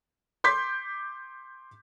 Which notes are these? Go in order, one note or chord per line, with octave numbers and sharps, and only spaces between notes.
C6 D6 G6 B6